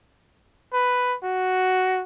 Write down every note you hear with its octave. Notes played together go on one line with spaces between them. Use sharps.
B4
F#4